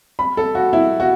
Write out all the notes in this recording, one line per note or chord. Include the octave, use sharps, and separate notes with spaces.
B5
A4
F#4
E4
F#4